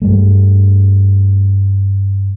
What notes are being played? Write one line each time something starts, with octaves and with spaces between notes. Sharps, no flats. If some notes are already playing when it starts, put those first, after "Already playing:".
G2 G3 A3